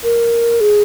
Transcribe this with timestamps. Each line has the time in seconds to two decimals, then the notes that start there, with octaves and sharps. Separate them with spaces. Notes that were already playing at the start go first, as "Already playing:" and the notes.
0.04 A#4
0.61 G#4